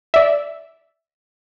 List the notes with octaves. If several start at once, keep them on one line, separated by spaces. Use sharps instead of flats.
D5 E5